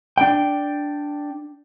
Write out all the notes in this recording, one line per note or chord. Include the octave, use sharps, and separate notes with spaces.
D4 G5